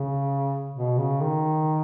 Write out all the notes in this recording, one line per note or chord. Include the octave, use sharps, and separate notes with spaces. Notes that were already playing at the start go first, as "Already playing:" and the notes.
Already playing: C#3
B2
C#3
D#3